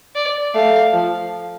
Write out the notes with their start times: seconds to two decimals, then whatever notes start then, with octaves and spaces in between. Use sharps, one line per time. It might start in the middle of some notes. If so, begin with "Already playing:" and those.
0.15 D5
0.54 A3 F5
0.93 F3